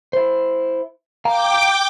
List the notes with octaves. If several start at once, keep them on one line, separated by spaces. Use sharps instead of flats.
E4 C5
F5 G5 A#5 D6